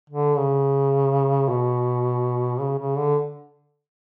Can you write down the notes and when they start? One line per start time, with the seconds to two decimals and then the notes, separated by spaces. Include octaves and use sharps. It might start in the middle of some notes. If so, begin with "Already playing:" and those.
0.10 D3
0.38 C#3
1.49 B2
2.61 C#3
2.79 C#3
2.98 D3